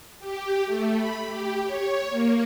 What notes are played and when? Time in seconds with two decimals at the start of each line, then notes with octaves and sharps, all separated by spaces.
0.19 G4
0.66 A3
0.96 B5
1.29 G4
1.64 C#5
2.10 A#3